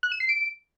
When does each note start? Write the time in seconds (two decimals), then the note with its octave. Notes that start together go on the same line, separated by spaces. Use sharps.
0.03 F#6
0.12 E7
0.20 C7
0.29 D7